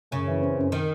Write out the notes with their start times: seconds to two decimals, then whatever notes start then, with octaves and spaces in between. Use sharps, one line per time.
0.11 F#2 C#3
0.28 E3
0.42 C4
0.57 F#2
0.72 D#3